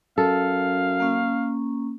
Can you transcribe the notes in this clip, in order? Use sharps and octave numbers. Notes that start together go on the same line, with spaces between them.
F#2 A4 F5
A#3 C#4